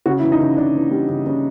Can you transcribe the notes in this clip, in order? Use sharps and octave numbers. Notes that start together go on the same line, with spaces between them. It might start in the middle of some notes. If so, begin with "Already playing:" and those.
C#3 F#4
E4
E3
D#4
C#3
C#3 D4
E3
G3
C#3
C#3